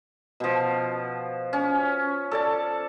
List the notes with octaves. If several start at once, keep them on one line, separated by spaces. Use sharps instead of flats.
B2 F3
C#4
A4 D5 A5